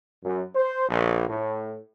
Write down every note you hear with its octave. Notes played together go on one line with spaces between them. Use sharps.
F#2
C5
A#1
A2